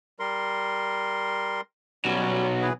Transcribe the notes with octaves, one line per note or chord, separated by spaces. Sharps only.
G3 A#4 C6
B1 F#3 G3 C#4
E3 G#4 B4